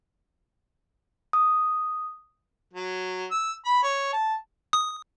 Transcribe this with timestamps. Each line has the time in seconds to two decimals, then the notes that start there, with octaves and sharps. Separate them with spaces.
1.33 D#6
2.73 F#3
3.31 E6
3.65 B5
3.83 C#5
4.13 A5
4.73 D#6